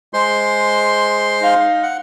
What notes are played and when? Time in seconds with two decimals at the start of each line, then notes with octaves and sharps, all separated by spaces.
0.13 G#3 C5 C6
1.41 D#4 F5
1.83 F#5